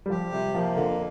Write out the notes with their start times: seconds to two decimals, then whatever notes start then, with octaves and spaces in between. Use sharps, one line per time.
0.06 G3
0.10 F3 G4
0.32 C3 G3
0.54 F3 A#3
0.75 F2 D3